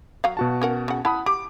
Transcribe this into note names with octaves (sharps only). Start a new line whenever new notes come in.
F#3 F5
B2 F#4 A5
C#4 A#4 F#5
C#3 F#5
E4 F#5 A5 B5 D#6
G4 D6